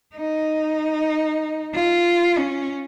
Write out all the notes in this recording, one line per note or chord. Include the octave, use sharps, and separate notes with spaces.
D#4
F4
C#4